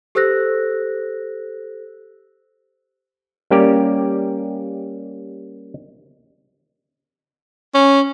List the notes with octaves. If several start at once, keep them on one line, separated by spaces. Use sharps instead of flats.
G4 A4 C5 E6 F#6 A#6
G3 A#3 C#4 G4 A#4 D5
C#4